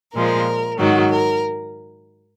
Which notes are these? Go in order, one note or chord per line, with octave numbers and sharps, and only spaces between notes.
A#2 F3 G#3 A#4
G#2 D#3 F#3 F#4
A#4